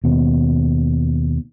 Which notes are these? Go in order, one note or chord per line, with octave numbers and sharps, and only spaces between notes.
D#2 B2